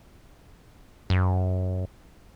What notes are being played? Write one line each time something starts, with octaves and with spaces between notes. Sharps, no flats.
F#2